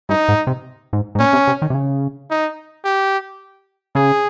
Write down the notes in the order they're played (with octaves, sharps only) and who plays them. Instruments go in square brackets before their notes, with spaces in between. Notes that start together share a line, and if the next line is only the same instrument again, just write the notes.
[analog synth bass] G2 [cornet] D#4
[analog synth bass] G#2
C3
G#2
G#2
[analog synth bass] A#2 [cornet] C#4
[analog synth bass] C3
C3
D#3
C3
C#3
[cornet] D#4
G4
[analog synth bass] C#3 [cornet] G#4